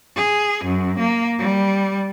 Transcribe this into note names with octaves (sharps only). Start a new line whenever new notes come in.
G#4
F#2
A#3
G3